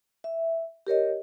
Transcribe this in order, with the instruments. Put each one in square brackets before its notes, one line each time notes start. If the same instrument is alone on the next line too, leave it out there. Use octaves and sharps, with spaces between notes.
[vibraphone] E5
G4 A#4 C#5 D#5